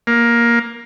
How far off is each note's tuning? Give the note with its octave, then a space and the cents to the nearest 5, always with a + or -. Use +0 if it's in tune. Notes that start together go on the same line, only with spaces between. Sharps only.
A#3 +10